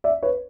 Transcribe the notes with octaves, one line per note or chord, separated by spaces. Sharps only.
D5 E5
B4 C#5